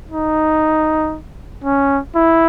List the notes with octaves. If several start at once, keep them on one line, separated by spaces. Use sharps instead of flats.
D#4
C#4
E4